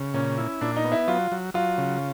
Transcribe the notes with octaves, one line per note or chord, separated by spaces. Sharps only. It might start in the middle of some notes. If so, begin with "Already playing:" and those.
Already playing: C#3
A#2 C#4
E4
A#2 D4
D#4
B3
E4
F#3 F4
F#3
F#3 F4
C#3